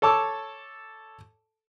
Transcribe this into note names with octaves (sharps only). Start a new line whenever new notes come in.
A4 C#5 A5 D6 E6